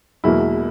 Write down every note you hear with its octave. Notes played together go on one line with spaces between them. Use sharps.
E1 E2 B2 F#3 A#3 E4